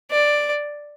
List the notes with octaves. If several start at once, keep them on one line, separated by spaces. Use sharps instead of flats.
D5